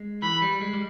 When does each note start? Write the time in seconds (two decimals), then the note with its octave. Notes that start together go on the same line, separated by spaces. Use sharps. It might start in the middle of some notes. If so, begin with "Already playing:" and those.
Already playing: G#3
0.22 E3 B5
0.42 G3
0.61 G#3
0.73 G3